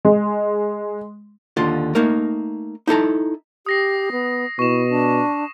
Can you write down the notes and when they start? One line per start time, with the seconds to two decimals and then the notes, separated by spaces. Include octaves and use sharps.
0.05 G#3
1.57 D#2 D3 F4 C6
1.95 A3 A#3 D#4 A#4
2.87 D#4 E4 A4 A#5
3.66 G4 D#6 A#6 C7
4.12 B3
4.59 B2 E4 C#6 E7
4.89 D4